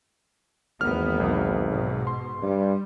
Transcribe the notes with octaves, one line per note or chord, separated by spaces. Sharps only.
G#1 E2 A#3 B3 F6
B1
G#2 B2
C6
G2 G3